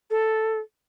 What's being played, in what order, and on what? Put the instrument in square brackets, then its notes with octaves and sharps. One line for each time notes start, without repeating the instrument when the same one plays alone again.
[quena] A4